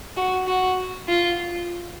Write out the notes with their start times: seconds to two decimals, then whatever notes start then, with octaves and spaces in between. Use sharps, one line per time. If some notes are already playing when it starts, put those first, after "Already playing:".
0.17 F#4
0.48 F#4
1.08 F4